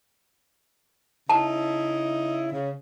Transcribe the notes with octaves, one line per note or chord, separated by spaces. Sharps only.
C#3 D#4 E4 A5
C#3